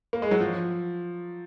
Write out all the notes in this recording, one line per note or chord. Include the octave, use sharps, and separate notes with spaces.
A#3
G#3
F#3
F3